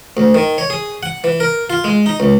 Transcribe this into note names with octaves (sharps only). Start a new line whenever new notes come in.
D2
D#3
C#5
G#4
F#5
E3
A#4
F4
G#3
D#4
C#2